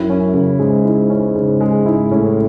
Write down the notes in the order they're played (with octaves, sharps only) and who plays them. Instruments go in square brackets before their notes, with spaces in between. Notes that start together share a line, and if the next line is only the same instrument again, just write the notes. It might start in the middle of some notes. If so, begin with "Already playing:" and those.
Already playing: [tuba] F#2 [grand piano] E4
[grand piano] C#4
C#3
[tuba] G#2 [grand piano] G#3
[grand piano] E4
C#4
C#3
G#3
E4
[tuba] A2 [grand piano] C#4